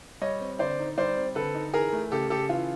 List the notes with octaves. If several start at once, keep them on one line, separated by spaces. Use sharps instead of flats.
G3 C#5 D#5
C4
D3 C5 D5
D#4
G3 C5 D5
C4
D3 A4 B4
D#4
E3 G#4 A#4
A3
C#3 G4 A4
C#3 G4 A4
E3 F4